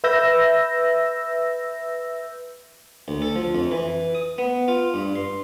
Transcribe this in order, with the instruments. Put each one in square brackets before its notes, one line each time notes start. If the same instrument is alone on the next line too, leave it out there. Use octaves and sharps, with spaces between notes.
[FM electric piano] B4 E5 E6 G6 A#6
[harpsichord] D2
A4
F3
F2
E3
D#6
B3
F4
G2
C6